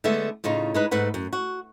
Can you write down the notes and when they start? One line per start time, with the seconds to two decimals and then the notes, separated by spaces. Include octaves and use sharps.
0.04 D3 G#3 A3 B3 E5
0.44 A2 C#3 D#4 F4
0.74 G#3 D#4 B4
0.91 G#2 A3 B4 F#5
1.14 F#2
1.33 F#4